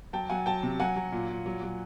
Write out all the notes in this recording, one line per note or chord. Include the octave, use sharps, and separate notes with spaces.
F#3 G5 A5
F#3 F#5 G#5
F#3 G5 A5
C3
F#3 F#5 G#5
F#3
A#2
A#2
F#3
F#3